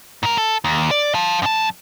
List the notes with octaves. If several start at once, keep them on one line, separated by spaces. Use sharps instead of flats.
G#2 A#4
A4
D#2
D5
F5 A5
F#2 A5